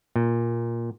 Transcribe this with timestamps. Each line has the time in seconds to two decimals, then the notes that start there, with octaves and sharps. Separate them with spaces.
0.16 A#2